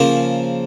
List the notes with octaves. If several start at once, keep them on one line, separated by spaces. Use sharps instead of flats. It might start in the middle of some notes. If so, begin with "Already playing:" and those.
Already playing: C#3 F3 A#3